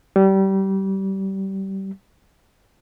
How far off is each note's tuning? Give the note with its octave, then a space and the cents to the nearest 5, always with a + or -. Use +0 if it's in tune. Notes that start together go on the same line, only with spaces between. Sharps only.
G3 -25